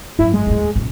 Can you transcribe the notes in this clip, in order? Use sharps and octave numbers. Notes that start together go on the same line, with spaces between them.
G#1 F#2 E4
G#3
D#2 A2
F#1 A#2